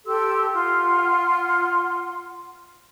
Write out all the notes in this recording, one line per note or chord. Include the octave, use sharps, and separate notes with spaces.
G4 A4 C6 E6
F4 F#5 C6